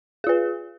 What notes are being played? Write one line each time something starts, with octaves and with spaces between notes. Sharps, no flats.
F4 G#4 B4